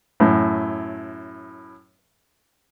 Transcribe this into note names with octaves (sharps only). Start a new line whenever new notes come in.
F#2 A2